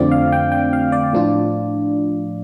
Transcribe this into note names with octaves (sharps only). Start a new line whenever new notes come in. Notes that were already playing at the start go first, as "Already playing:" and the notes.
Already playing: F2 D3 A3 C4 F4 D5
F5
G5
G5
F5
D5
A2 F3 D4 F4